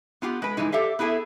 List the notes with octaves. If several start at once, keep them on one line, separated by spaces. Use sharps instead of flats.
B3 F4 G4 F#5
G#3 B4
G2 C#3 E3 G#3 D#4
G4 A4 D5 E5 F5
B3 E4 G#4 A4 E5